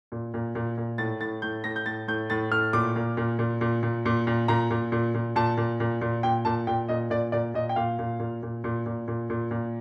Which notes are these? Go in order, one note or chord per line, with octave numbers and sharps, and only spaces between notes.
A#2
A#2
A#2
A#2
A2 A6
A2 A6
A2 G6
A2 A#6
G6
A2 A6
A2 G6
A2 A6
A2 F6
A#2 D6
A#2
A#2
A#2
A#2
A#2
A#2
A#2
A#2 A#5
A#2
A#2
A#2
A#2 A5
A#2
A#2
A#2
A#2 G5
A#2 A5
A#2 G5
A#2 D#5
A#2 D5
A#2 D5
A#2 D#5
G5
A#2 F5
A#2
A#2
A#2
A#2
A#2
A#2
A#2
A#2